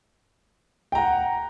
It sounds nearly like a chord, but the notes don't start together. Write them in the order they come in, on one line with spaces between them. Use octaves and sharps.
G5 A#5 F#5